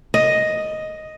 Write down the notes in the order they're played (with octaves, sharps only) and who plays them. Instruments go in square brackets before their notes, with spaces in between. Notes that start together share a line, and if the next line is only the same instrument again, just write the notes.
[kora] D#5